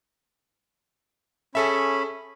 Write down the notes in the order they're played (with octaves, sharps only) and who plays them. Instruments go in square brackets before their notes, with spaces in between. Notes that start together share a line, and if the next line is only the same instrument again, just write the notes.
[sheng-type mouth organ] C#4 B5 [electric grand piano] G#4 A4 E5